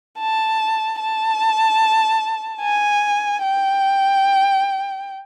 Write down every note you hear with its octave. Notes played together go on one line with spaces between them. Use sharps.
A5
A5
G#5
G5